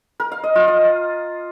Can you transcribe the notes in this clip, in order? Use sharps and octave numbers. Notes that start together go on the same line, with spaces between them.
A#4
F5
D#5
F4
D#5